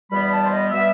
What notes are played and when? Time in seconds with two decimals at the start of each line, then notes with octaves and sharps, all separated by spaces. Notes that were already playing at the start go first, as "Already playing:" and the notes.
0.11 E2 B2 G3 B3 B5
0.32 A5
0.45 C5
0.51 D#5
0.71 B2 G3 B3 E5